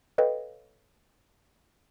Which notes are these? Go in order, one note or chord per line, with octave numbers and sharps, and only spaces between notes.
A4 B4 C#5 D#5 F5 G5